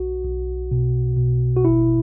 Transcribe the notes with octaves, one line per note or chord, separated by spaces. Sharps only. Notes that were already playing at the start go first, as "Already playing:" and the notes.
Already playing: B1 F#4
B1
B2
B2
F#4
G#1 E4